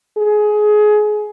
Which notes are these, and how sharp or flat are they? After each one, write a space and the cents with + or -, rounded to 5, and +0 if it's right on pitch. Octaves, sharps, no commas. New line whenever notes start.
G#4 +20